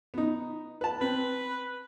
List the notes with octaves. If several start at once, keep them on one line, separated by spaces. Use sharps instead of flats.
B3 D#4
B4 A5
C4 B4